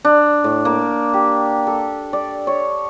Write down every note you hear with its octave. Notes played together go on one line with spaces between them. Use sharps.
D4
A2
A#3
G4
A4
D5
C#5